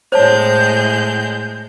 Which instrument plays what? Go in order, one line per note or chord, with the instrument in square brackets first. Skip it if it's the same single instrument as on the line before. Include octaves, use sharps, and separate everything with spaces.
[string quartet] A2 G#3 G6 [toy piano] C5 C#5 A5